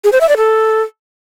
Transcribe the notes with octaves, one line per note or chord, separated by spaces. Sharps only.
G#4
C5
E5
D5
A4